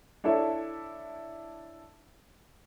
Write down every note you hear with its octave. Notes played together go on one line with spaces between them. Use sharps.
D4 E4 A4 C#5 E5